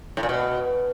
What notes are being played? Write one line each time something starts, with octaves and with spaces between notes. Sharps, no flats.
A2
A#2
B2